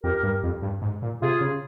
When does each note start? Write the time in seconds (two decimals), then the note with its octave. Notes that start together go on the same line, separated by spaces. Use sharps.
0.03 F2 G4 A#4
0.23 G2
0.43 F2
0.62 G2
0.82 G#2
1.02 A#2
1.22 C3 F4 G#4
1.41 C#3